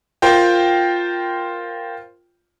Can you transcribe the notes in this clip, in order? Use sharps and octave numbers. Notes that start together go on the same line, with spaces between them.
F4 A#4 C5 G5